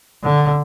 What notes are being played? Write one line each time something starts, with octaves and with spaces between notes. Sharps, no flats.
D3